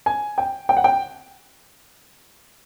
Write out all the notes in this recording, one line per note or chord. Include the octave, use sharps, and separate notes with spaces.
G#5
G5
G5
F#5
G5